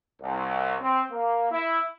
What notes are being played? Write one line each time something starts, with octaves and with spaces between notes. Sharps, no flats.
C2
C4
A#3
E4